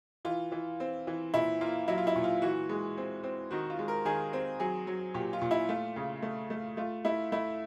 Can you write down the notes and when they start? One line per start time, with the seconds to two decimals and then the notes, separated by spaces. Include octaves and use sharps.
0.25 E3 F4
0.52 E3
0.80 C4
1.07 E3
1.34 A#2 E4
1.61 A#3 F4
1.88 F#3 E4
1.98 F4
2.07 E4
2.16 A#2
2.24 F4
2.42 E3 F#4
2.69 G#3
2.97 C4
3.23 C4
3.51 D#3 F#4
3.70 F4
3.79 G#3
3.88 A#4
4.05 D#3 G#4
4.33 C4
4.60 F#3 G#4
4.87 F#3
5.14 A#2 G4
5.33 F4
5.41 A#2
5.51 E4
5.69 A3 F4
5.96 C#3
6.22 A3
6.50 A3
6.77 A3 F4
7.05 A3 E4
7.32 A3 E4